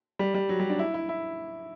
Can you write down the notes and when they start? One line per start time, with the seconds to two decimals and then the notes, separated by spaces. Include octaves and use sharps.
0.19 G3
0.34 G3
0.49 F#3
0.60 G3
0.70 D4
0.79 E4
0.94 E4
1.09 E4